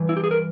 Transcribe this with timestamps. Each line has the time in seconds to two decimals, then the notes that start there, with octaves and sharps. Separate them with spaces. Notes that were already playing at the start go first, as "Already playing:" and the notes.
Already playing: G2 E3
0.09 E4
0.17 G4
0.24 G#4
0.31 A#4